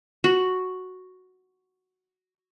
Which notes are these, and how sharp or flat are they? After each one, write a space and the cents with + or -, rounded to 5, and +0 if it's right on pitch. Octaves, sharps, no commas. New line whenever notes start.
F#4 +0